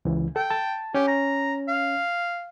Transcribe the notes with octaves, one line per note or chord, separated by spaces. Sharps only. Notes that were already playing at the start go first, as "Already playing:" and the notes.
C#2 E3
A4 G5
A5
C#4 G4
A#5
F5